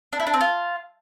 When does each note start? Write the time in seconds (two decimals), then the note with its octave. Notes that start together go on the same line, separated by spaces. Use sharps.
0.13 D4
0.20 E4
0.27 D4
0.34 C4
0.41 F4